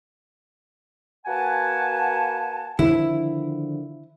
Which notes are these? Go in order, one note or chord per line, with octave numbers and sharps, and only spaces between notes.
A#3 F#4 B4 F#5 G#5 A5
D3 D#3 F3 E4